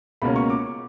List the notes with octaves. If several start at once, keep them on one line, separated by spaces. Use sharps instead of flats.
C#2 B2 A#3 C#4 B5
C#6
D6